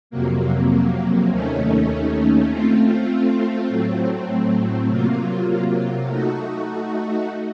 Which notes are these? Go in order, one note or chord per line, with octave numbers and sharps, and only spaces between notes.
F2 C3 F#3 A#3
D#2 D#3 A3 C#4
A3 C4 F4
A2 F#3 A3 C4
C3 F#3 A#3 F4
A3 D#4 F#4